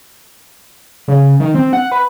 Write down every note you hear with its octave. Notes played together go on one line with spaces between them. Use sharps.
C#3
D#3
C4
F#5
B4